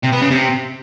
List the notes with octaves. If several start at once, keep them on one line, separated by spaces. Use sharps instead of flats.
C3
B3
C#3
C3